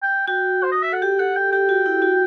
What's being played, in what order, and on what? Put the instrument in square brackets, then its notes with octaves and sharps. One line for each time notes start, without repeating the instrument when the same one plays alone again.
[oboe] G5
[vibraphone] F#4 [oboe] G5
[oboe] C5
D#5
E5
[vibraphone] A4 [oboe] F#5
[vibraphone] G4 [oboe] G5
[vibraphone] A4 [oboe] F#5
[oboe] G5
[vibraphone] G4 [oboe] G5
[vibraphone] F#4
E4
F#4